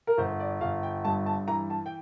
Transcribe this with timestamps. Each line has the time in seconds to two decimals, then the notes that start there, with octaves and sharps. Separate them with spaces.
0.07 A#4
0.17 G1 C5
0.40 D5
0.61 G1 F5
0.83 G5
1.05 G2 A5
1.26 A5
1.48 E3 A#5
1.70 A5
1.86 G5